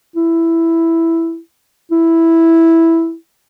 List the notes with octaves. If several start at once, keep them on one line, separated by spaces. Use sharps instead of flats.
E4
E4